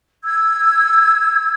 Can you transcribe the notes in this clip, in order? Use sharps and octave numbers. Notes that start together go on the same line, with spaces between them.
E6 G#6